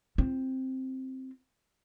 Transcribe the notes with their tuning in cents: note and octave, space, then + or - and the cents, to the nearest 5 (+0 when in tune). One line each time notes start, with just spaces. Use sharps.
C4 +0 F4 -35